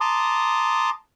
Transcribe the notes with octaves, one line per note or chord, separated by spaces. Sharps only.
A5 A#5 C6 D6 D#6